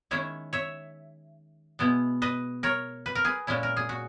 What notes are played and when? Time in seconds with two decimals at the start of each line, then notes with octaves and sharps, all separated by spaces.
0.11 D#3 G#3 C#4 E4 C#5 E5
0.53 C#5 E5
1.79 B2 G#3 B3 E4
2.22 B4 D#5
2.63 A#4 C#5
3.06 B4
3.15 A#4
3.25 G#4 B4
3.47 A#2 G#3 C#4 E4
3.63 A#4
3.77 G#4
3.89 F#4